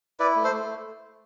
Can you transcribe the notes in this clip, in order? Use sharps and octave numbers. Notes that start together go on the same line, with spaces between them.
E4 B4 D5
A3
A4 C5
A3